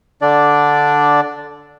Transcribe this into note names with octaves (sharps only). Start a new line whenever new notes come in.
D3 D4 D5